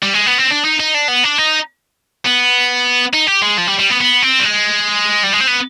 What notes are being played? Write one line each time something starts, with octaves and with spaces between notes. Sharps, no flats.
G3
G#3
B3
C4
D4
D#4
D#4
D4
B3
D4
D#4
B3
D#4
G4
G#3
F3
G3
G3
B3
B3
C4
G3
G#3
G3
G#3
C4
B3